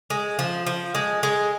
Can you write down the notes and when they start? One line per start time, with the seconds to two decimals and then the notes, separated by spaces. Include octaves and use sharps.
0.10 G#3
0.39 F3
0.66 F3
0.95 G#3
1.23 G#3